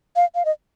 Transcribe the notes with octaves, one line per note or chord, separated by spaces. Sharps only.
F5
F5
D#5